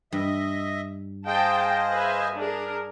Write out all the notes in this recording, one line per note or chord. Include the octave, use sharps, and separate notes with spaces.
G2 D#5 E5
G#4 C5 D#5 F5 G5 A5
B4 E5 G#5
D4 G#4 A#4